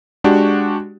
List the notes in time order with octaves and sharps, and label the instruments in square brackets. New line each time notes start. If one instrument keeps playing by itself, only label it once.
[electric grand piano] G#3 D4 F#4 G4